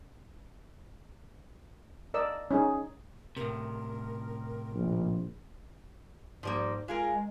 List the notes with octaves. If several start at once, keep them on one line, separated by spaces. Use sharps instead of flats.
A#4 D5 D#5 E6
C#4 D#4 G#4
A2 C3 A#4
A#1
G#2 F3 G3 A#3
G#3 F4 G#4 A#4
G#3